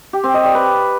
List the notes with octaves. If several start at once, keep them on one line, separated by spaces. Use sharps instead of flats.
G4
C4
D#5
D5
B4